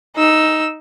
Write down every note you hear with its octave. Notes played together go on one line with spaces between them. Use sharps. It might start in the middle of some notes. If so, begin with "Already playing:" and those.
D#4 E6